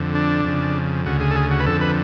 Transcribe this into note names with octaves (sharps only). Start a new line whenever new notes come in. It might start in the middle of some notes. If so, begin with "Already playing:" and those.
Already playing: F2 D3
D4
F2 C#3
D2 C#3 F#4
G#4
A4
G#4
F#4
B4
F2 D3 A4
B4